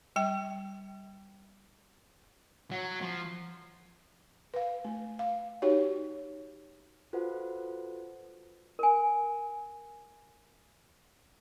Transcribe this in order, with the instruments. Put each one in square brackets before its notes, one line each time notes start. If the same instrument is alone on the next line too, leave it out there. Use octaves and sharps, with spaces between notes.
[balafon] G3 G5
[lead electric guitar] F#3
F3
[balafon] B4 F5
A3
F5
D#4 F#4 G4 C#5
[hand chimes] F4 F#4 A4 B4 C5 F#5
[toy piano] A#4 G#5